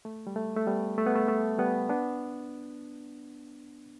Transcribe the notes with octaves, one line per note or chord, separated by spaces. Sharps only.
A3
G3
A3
A3
G3 B3
A3
B3
A3
A3
G3 B3
B3 D4